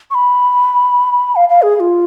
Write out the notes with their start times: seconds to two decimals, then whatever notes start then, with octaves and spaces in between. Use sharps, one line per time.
0.11 C#6
0.15 B5
1.36 F5
1.49 F5
1.62 G#4
1.76 G#4
1.80 F4